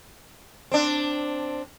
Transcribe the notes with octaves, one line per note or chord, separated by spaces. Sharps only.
C4 D4